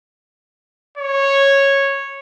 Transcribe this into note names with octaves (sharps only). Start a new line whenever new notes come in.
C#5